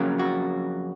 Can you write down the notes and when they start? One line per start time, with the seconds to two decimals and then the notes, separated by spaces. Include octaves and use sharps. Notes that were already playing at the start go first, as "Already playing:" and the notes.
Already playing: F2 C#3 F#3 A#3
0.19 F#4